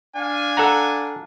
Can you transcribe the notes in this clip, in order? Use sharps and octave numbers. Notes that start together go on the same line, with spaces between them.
D4 F5 G#5
A4 F#5 A#5